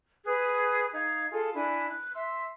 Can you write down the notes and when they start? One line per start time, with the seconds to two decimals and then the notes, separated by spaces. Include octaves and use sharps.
0.25 G#4 B4 F#6
0.93 D#4 F5 G#6
1.31 F4 G#4 A4
1.54 D4 E4 G#5
1.89 F#6
2.14 E5 C6 E6